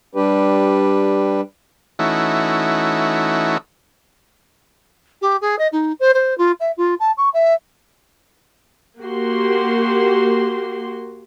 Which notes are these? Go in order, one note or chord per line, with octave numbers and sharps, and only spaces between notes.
G3 D4 G4 B4
E3 A3 C#4 D#4 E4 F#4
G4
G#4
D#5
D#4
C5
C5
F4
E5
F4
A5
C#6
E5
A#3 F#4 G4 C6